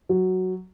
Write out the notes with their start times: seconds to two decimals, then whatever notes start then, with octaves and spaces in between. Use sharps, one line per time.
0.09 F#3